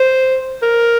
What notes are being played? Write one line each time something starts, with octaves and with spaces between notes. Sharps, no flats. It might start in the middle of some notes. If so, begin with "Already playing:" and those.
Already playing: C5
A#4